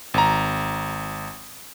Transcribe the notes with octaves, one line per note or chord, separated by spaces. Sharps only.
G#1 A#5